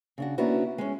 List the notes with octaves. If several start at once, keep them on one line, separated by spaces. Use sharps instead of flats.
C#3 D4 F#4
A#3 B3 C#4 D4 E4 F#4
G#3 C#4